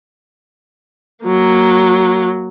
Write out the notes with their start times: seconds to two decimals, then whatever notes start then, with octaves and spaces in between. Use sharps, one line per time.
1.25 F#3 A#3